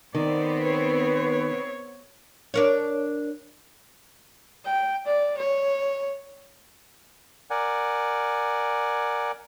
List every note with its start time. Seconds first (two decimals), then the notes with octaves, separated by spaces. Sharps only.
0.15 D#3 B3 C4 D5
0.62 B4 C#5
2.54 D4 A#4 C#5
4.65 G5
5.06 D5
5.38 C#5
7.51 A#4 D5 F#5 G#5